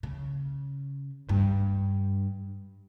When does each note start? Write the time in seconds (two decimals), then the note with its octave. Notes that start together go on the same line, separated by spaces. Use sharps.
0.03 C#3
1.29 G2